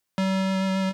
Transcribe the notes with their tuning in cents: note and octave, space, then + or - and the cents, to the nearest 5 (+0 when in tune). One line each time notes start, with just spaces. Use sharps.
G3 -45